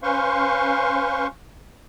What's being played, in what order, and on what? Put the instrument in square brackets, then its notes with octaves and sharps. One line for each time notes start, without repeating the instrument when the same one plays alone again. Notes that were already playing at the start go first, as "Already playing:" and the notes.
[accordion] C#4 B4 C5 F5 C6 C#6